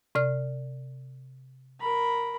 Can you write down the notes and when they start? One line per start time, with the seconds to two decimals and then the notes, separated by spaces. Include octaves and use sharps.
0.15 C3 D5 F6
1.80 A#4 B5